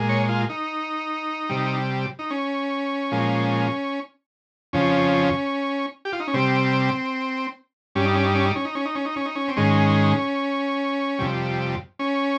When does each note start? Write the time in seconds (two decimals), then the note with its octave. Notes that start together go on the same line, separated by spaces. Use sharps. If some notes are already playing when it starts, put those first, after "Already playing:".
Already playing: A#2 G#3
0.09 C#5
0.29 F4
0.49 D#4
1.49 C3 G3
2.19 D#4
2.30 C#4
3.12 A#2 F3 G#3
4.73 F2 C#3 F3 C#4
6.05 G4
6.13 F4
6.20 D#4
6.28 C#4
6.34 C3 G3 C4
7.95 G2 G3 C#4
8.05 D#4
8.15 C#4
8.25 D#4
8.35 C#4
8.45 D#4
8.55 C#4
8.65 D#4
8.75 C#4
8.85 D#4
8.95 C#4
9.05 D#4
9.16 C#4
9.25 D#4
9.35 C#4
9.48 C4
9.56 G#2 D#3 G#3 C#4
11.19 F2 C3 G3
11.99 C#4